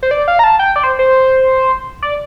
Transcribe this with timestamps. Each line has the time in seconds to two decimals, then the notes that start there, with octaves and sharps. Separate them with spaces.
0.03 C5
0.11 D5
0.28 F5
0.39 A#5
0.44 A5
0.59 G5
0.76 D5
0.83 C5
0.99 C5
2.02 D5